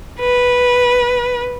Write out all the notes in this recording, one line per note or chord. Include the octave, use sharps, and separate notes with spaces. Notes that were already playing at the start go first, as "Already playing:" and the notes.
B4